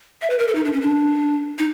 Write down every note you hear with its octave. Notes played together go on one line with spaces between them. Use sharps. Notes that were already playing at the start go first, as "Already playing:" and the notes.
E5
B4
A#4
A4
D#4
D4
C#4
D4
D#4